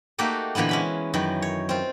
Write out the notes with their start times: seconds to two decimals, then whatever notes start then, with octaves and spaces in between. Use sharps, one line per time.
0.18 A3 A#3 D#4 F#4 G4 A4
0.55 A#2 D3 E3 A#3 B3
0.69 G#3 C#4 B5
1.14 F#2 D#3 E3
1.42 C#5
1.69 C4 F4